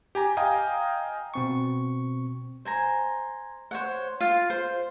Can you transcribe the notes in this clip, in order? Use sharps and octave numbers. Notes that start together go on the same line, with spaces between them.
G4 G#5 A#5
D#5 F5 G5 G#5 A#5 D#6
B2 C4 C#6
C5 G#5 A#5
C5 C#5 F#5
F4 F5
C5